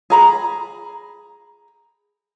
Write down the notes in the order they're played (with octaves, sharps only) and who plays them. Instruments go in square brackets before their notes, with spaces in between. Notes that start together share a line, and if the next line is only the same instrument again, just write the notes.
[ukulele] G#4 A#5 B5